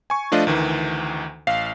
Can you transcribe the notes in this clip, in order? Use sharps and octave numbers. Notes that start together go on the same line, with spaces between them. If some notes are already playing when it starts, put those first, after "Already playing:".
G#5 C#6
F3 A3 D4 F4 D#5
D2 D#3 E3
A1 F5 C7